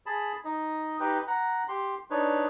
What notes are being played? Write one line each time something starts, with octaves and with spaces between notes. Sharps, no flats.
G#4 A5 B5
D#4 D#5
D#4 G4 B4 G5
F#5 A#5
G4 C6
D4 D#4 B4 C#5